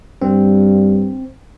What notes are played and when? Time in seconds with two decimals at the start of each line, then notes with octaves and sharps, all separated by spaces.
0.22 G2 C4